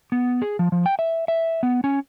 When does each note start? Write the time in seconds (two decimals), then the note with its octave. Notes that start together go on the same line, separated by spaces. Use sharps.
0.12 B3
0.42 G#4
0.59 F3
0.72 F3
0.86 G5
0.99 E5
1.28 E5
1.63 B3
1.84 C#4